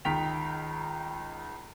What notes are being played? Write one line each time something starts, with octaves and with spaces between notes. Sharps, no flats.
C#2 D#3 G5 B6 F7